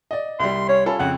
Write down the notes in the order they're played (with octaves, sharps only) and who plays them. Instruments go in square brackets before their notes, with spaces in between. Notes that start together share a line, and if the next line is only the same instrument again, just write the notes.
[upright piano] D5 D#5
[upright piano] C2 G3 [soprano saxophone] C6
[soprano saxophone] C#5
[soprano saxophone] C#4 [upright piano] F4 A4 B5
[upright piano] F2 C#3 [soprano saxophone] F#5